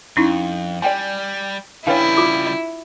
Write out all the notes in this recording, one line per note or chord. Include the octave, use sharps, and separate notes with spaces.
F2 C#4 D#4 E4
G3 D5 G5 G#5
C#3 G3 D4 E4 B4 C#5 F5 G5
F4 D6 D#6